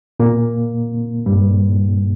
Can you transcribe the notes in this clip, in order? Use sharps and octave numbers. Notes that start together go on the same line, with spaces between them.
A#2 A#3
G2 G3